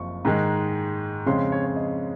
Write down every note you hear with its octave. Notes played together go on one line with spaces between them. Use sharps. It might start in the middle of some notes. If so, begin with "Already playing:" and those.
Already playing: F#1 F3 C4 C#6
G#2 D#3 G#3
F2 C#3 G#3 C4 C6
C6
C#5
C#5
D#5